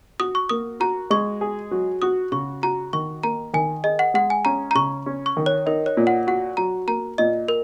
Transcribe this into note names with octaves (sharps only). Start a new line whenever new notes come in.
F#4 D#6
C#6
A#3 D#6
F#4 A#5
G#3 C#6
G#4
F#3
F#4 D#6
C#3 C#6
F#4 A#5
D#3 C#6
A#3 A#5
D#3 G#5
G#4 D#5
F#5
G#3 F#5
G#5
C#4 A#5
A#5
C#3 C#6
C#4
C#6
D#3
C#5
D#4 A#4
C#5
A#2
F#5
F#4 F#5
F#3 A#5
A#3 A#5
A#2 D#5
A#4